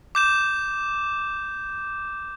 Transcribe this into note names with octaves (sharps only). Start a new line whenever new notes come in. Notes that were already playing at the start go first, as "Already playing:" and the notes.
D6 G6 E7